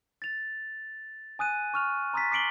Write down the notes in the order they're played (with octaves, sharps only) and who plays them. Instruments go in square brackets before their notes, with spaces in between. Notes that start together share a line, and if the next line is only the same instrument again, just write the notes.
[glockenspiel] A6 F7
G#5 D#6 F#6 D#7
C#6 F6 F7
A#5 C6 D#6 F6 A6 B6
D6 B6 C7 D7 F#7 G7